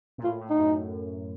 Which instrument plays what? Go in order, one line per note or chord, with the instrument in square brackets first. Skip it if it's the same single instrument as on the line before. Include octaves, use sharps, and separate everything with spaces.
[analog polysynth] A#2
[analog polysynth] A2 [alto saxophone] F4
[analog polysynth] A2
[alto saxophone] D#4
[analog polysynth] F#2